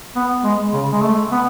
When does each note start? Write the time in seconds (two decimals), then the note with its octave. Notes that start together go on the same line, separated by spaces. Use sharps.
0.16 B3
0.44 G#3
0.73 C#3
0.92 G#3
1.03 A3
1.31 B3